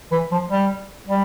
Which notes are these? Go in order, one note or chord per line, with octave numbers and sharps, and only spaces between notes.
E3
F3
G3
G3